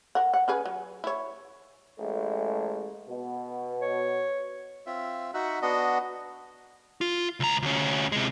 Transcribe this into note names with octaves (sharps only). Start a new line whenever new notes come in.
A#4 F#5
F#5
C#4 G#4 B4
F#3
E4 C#5
A1 G#3 A3
B2
C#5
C4 F4 E5
D#4 F#4 E5 F#5
B3 D4 F#4 D#5
F4
C#2 A#5
D2 C#4
C3 G#3